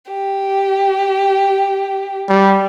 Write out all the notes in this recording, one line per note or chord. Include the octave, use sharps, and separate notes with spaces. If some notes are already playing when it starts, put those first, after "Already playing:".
G4
G3